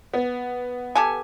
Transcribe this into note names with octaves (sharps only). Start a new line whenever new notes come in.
B3
G4 A4 G#5